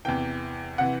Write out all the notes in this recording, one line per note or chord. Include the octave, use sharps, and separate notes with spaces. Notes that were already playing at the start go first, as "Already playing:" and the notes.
E2 C3 E3 G5
C3 E3 F#5